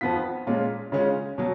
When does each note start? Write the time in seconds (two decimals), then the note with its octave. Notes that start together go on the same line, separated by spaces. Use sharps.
0.01 F2 F3 B3 F4 B6
0.47 A#2 G#3 C#4 F4
0.92 C#3 G#3 C#4 F4
1.38 B2 F#3